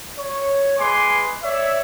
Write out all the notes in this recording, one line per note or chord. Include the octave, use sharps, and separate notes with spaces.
C#5
G#3 B4 G#5 C6 D6
C#5 D5 E5